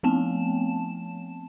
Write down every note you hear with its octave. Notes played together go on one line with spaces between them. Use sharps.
F3 A3 B3 C4 A5 E7